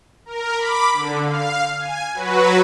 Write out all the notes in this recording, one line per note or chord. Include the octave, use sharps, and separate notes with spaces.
A#4
B5 D6
D3
F5
G#5
F#3 F#4 B4